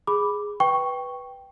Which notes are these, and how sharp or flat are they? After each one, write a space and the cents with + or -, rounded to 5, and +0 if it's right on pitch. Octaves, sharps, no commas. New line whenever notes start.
G#4 +0 B5 +0 D6 +0
B4 +0 G5 -5 C#6 +0